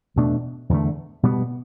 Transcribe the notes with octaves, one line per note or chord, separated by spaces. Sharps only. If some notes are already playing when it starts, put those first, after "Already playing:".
E2 B2 A3 D4
E2 D3 A3
B2 G3 B3